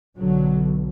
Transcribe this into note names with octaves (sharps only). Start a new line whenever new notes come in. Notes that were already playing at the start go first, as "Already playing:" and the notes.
B1 B2 D3 F#3